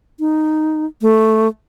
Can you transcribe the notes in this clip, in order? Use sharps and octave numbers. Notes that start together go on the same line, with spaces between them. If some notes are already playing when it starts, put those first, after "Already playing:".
D#4
A3